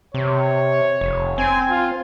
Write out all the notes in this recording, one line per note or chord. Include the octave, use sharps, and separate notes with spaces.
C3 C#5
F1
C4 G#5
F4